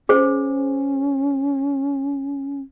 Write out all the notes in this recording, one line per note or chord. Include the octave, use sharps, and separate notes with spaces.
C#4 G#4 C5